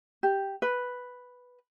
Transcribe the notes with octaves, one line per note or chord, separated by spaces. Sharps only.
G4
B4